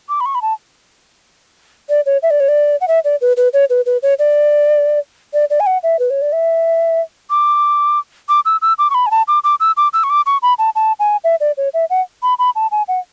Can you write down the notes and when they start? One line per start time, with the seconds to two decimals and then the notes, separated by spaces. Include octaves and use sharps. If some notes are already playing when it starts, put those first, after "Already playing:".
0.09 D6
0.21 B5
0.26 C#6
0.35 B5
0.42 A5
1.89 D5
2.06 C#5
2.23 E5
2.31 D5
2.40 C#5
2.48 D5
2.81 F#5
2.88 E5
3.04 D5
3.21 B4
3.37 B4
3.53 C#5
3.70 B4
3.86 B4
4.03 C#5
4.19 D5
5.34 D5
5.50 D5
5.60 G#5
5.67 F#5
5.83 E5
5.99 B4
6.10 C#5
6.22 D5
6.33 E5
7.30 D6
8.29 D6
8.45 E6
8.62 E6
8.79 D6
8.90 C#6
8.95 B5
9.06 G#5
9.11 A5
9.28 D6
9.44 D6
9.60 E6
9.77 D6
9.93 E6
10.04 C#6
10.10 D6
10.26 C#6
10.42 B5
10.58 A5
10.75 A5
11.00 G#5
11.24 E5
11.40 D5
11.57 C#5
11.74 E5
11.90 F#5
12.23 B5
12.39 B5
12.56 A5
12.71 G#5
12.88 F#5